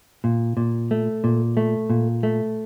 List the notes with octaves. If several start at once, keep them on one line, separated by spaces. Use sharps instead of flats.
A#2
A#2
A3
A#2
A3
A#2
A3